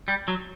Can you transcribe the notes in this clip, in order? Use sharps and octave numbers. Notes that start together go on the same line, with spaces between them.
G3
F#3